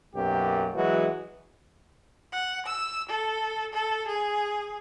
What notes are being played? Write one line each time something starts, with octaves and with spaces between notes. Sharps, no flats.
B1 F#2 A#3 G4
E3 F#3 G#3 F#4
F#5
E6
A4
A4
G#4